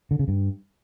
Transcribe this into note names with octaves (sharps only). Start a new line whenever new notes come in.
D3
C#3
G2